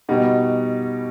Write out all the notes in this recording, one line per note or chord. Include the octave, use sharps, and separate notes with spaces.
B2 G3 D#4 F#4